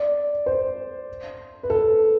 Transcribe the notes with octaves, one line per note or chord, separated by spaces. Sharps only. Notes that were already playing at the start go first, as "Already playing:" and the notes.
Already playing: D5
C5
B4
A4